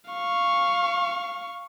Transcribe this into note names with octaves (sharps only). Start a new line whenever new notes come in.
F5 C#6